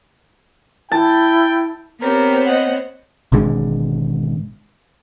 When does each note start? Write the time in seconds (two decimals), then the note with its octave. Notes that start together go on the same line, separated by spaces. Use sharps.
0.92 E4 G5 A5
2.01 B3 C4 G4 A#4 C#5
2.47 D#5 F#5
3.32 G#1 B2 D3 G#3